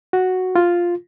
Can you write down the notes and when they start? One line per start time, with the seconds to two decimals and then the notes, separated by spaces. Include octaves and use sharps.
0.13 F#4
0.55 F4